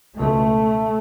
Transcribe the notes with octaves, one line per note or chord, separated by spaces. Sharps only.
C#2 B2 A3